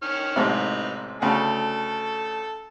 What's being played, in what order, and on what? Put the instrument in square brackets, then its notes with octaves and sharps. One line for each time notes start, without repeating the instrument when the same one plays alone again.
[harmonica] D#3 C#5 F6
[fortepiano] A1 G#2 C3 [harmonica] D#4 B4
[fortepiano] D2 C#3 [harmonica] A4